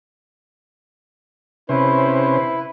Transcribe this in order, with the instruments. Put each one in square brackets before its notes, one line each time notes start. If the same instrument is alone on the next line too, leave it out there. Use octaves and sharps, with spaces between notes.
[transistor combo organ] C3 C#4 C5 [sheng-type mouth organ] E4 B4